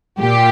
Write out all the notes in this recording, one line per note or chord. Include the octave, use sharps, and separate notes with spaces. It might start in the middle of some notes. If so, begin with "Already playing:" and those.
A#2 G4